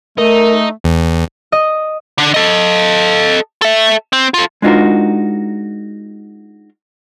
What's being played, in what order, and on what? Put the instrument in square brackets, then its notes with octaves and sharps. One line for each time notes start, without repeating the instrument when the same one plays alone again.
[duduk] A3 [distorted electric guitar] D#4 [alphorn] A#4
[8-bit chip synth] E2
[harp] D#5
[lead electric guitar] D3 D4
A4 D#5
A4 E5
C4
F4 A4
[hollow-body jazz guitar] G#3 D4 D#4 F4 F#4 A#4